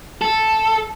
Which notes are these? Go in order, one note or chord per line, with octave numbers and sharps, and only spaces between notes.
A4